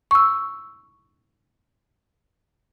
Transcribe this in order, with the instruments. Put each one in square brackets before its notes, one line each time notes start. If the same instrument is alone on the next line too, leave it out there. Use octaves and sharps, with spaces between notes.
[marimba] C#6 E6